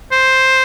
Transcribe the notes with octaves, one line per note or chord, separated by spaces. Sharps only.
C5